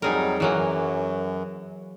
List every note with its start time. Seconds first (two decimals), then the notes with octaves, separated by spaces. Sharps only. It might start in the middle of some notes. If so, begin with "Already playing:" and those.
0.02 F2 F#3 G3 D#4 G#4 A#4
0.40 F#2 E3 F#3 A#3